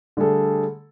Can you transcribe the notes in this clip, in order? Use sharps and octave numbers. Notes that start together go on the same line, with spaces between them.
D3 G3 A3 G#4 A4